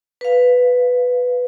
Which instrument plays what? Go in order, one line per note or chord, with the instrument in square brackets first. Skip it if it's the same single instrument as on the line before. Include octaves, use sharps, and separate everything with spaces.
[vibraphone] B4 F5